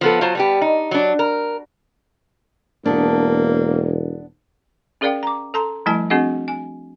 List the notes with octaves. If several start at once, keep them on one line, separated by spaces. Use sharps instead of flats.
F3 B3 A4
F#3 F4 C5 A5
G3 B3 G4
D#4
F#3 D4
A#4
E1 A#3 B3 D4
C#4 G#4 A#4 D5 F5 G5
A#5 D6
A4 A5 A#5 C6
F3 G3 A3 E4 G#5 A5
C4 D4 F#4 G#4 D#5 F#5
G#5